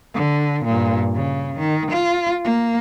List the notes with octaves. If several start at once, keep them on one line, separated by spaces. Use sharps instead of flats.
D3
G2 A#2
C#3
D#3
F4
A#3